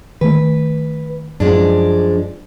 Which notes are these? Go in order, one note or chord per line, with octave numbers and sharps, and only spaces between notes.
D#3 A3 B4
F#2 F3 G#3 D4